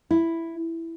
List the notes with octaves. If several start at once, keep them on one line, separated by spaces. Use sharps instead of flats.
E4